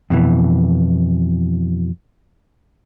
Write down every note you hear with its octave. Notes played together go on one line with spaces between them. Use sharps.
F2 B2 E3